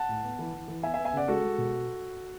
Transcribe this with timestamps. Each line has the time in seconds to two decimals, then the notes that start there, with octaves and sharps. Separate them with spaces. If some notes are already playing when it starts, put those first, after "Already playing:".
Already playing: F#5 A5
0.09 A2
0.23 B3
0.39 E3
0.53 E3
0.68 E3
0.83 B3 E5 G#5
0.94 E5 G#5
0.98 B3
1.05 E5 G#5
1.13 C#3 D5 F#5
1.28 G#3 F#4 A4
1.43 G#3
1.58 B2